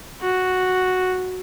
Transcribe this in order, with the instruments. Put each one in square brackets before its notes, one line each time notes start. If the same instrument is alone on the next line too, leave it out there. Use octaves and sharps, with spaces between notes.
[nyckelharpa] F#4